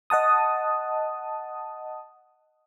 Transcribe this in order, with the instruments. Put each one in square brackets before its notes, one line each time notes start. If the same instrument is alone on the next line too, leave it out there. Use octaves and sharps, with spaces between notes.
[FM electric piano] D#5 F#5 A5 D#6